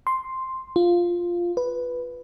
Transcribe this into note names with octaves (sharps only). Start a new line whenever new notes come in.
C6
F4
B4